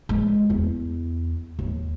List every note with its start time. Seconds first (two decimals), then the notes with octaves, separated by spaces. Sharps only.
0.09 G#3
0.50 E2
1.59 D#2